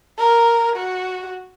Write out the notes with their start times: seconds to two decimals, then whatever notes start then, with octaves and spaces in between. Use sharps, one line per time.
0.18 A#4
0.76 F#4